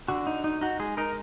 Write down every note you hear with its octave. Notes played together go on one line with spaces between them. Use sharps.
D3 F#4
D#4
D#4
D#4 F#4
G#3 G#4
D#4 A#4